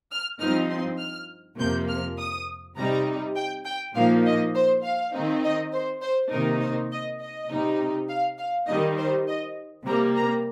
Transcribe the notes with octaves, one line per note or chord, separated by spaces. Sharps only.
F6
G2 F3 C4 D#4 F6
C6
F6
F2 C3 F3 A#3 G6
F6
D#6
C3 G3 D#4 A#5
G5
G5
A#2 F3 A#3 D#4 F5
D#5
C5
F5
D#3 C4 D#4
D#5
C5
C5
C3 D#3 A#3 D#4 A#4
C5
D#5
D#5
C3 G3 D#4
F5
F5
D#3 G3 D#4 D#5
C5
D#5
C3 G3 A#3 A#5
A#5